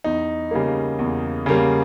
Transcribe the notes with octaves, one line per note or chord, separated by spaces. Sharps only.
E2 D#4
C#3 G3 A#3
E2
C#3 G3 A#3